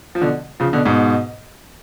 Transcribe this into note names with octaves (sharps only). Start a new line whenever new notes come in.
F3
B2 D3
C#3 F3
B2 D3
G#2 B2